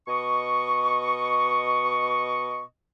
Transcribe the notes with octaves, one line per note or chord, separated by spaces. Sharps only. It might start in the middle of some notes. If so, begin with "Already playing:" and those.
B2 D#5 C#6